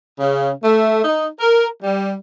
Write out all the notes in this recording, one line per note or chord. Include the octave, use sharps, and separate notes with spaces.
C#3
A3
D#4
A#4
G3